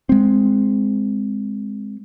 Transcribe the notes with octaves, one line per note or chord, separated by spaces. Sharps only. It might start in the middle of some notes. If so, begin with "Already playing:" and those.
G#3 C4